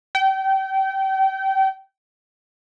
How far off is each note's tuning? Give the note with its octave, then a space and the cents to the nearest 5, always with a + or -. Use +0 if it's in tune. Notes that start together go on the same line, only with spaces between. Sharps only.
G5 -30